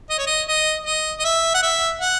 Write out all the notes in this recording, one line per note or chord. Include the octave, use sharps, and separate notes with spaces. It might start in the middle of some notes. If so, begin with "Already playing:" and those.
D#5
C#5
D#5
D#5
D#5
D#5
E5
F#5
E5
F#5